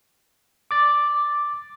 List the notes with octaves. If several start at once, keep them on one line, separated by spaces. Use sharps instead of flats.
D6 A6